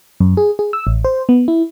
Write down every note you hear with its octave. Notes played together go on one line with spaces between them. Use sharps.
F#2
G#4
G#4
E6
A1
C5
B3
E4